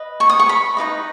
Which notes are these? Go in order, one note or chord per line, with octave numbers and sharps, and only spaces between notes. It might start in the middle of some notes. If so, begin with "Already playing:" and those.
Already playing: B4 D#5
C#6
D#6
C#6
B5
D#4 F#4 B4 D#5